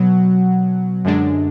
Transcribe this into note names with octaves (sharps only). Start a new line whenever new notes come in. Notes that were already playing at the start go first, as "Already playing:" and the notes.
Already playing: B2 F#3 F#5
F#2 D3 G#3 D4